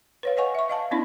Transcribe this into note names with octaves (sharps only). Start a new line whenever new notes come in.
B4 C#5 F5
C#5 D#5 F#5 G#5 C#6
E5 C#6
D#5 F5 A5
B3 C#4 D4 E4 D5 B5